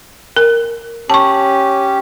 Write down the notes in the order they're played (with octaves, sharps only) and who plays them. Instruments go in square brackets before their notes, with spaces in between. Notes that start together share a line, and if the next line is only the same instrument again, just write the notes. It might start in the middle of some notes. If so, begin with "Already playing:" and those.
[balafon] A#4
[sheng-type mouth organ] C#4 G4 [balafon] A5 C#6